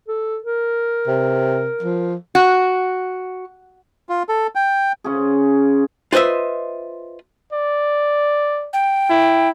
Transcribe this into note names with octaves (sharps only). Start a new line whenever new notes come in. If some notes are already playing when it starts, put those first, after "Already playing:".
A4
A#4
C3
F3
F#4
F4
A4
G5
C#3 C#4 F4 G#4
F4 B4 C5 D#5 E5
D5
G5
E4